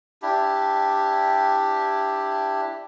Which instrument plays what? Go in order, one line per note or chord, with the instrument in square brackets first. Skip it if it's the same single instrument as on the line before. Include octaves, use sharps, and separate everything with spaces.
[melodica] D4 E4 G4